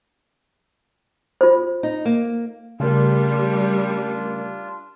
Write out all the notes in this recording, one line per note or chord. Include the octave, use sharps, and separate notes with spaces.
F4 C5
D#4
A#3
C#3 G3 A3 D4 F4 A#4